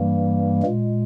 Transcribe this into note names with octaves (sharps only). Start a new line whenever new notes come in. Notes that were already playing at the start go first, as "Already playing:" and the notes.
Already playing: G2 E3 G3 A#3
A#2 G#3